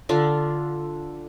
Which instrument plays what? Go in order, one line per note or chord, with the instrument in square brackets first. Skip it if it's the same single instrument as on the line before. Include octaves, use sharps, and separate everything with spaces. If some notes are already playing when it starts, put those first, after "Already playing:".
[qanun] D3 D4 F4